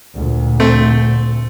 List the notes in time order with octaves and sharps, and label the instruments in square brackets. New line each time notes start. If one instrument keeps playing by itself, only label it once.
[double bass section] D2 A#2
[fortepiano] A3 C4